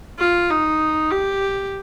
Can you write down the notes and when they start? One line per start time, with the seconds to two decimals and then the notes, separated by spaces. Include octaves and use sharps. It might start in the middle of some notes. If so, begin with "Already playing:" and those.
0.19 F4
0.51 D#4
1.11 G4